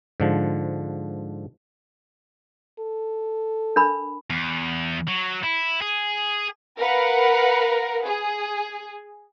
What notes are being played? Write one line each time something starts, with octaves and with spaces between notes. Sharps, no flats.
G#2 D3 F3
A4
D4 A#4 B5
E2
F#3
E4
G#4
A#4 B4 F5 F#5
G#4